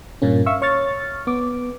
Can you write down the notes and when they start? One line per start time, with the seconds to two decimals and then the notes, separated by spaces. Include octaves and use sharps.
0.22 G2 A#2 A#3 C#4
0.46 E5 F5 C#6 E6
0.62 C#5 C#6 F6 A6
1.27 B3 D6